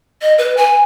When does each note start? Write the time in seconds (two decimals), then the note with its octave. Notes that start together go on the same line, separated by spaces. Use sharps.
0.22 D#5
0.38 B4
0.57 G#5